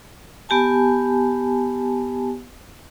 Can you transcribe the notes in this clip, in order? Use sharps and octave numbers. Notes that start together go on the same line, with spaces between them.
B3 G4 G#5 A5